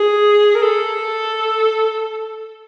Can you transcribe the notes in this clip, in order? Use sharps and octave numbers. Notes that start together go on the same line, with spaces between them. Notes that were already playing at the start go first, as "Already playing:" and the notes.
Already playing: G#4
A#4
A4